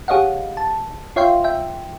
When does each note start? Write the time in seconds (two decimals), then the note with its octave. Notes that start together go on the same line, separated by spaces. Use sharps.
0.08 G4 G#4 C#5 D#5 F5 F#5
0.57 A5
1.16 F4 C#5 E5 F5 G5 C6
1.44 E5 G5